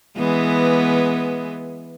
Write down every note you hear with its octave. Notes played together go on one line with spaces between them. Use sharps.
E3 G#3 B3